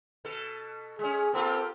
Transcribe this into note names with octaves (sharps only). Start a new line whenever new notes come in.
B2 A4
G#3 C#4 G#4
A#3 C4 F4 G4 A4